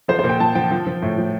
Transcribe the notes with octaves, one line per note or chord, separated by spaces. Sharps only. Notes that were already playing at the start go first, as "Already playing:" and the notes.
F3 C5
C5
A#2
G5
F3 A5
F3 G5
F3
F3
A2
F3